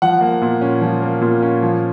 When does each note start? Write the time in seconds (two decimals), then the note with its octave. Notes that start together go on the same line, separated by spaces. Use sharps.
0.02 F3 F#5
0.21 A#3
0.42 A#2
0.61 C#4
0.81 F3
1.02 A#3
1.21 A#2
1.42 C#4
1.62 F3